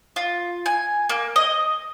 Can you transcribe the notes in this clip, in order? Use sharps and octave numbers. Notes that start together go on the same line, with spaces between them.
F4
G#5
A#3
D#5